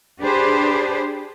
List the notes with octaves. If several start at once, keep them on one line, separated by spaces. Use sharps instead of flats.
D4 G4 G#4 B4 C5